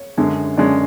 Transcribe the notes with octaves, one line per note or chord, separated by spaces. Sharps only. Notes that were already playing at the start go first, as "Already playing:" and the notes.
Already playing: C#5
F#2 D3 G#3 C#4
F#2 D3 G#3 C#4 D5